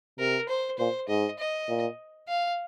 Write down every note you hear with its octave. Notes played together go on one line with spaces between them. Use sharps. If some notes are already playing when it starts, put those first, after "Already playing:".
C3 A#4
C5
A#2 C5
G#2 D#5
D#5
A#2
F5